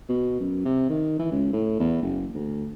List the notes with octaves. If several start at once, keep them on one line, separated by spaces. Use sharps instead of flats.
B2
F#2
C3
D#3
E3
C#2
A2
E2
F#1
D2